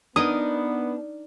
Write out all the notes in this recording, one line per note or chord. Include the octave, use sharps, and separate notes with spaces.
B3 D4 D#4 A#4 D#6